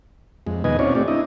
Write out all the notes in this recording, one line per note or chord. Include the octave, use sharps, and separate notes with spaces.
F2 G#3
D#2 B2 D#4 B4 D#5 G#5
C4 C#4 D#4 F4 C#5 D5
A3 C4 G4 D5
D4 E4 D#5